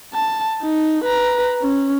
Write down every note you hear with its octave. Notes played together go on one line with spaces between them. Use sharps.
A5
D#4
B4 A#5
C#4